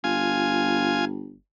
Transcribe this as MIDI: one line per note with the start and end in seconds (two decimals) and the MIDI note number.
0.04 1.35 31
0.04 1.05 65
0.04 1.05 80